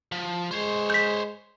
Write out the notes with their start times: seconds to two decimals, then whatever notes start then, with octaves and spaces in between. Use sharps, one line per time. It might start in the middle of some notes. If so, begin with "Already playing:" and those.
0.12 F3
0.51 G#3 C5 C#5
0.90 G6 B6